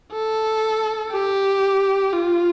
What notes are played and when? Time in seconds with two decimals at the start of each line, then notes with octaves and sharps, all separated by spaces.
0.12 A4
1.11 G4
2.12 F4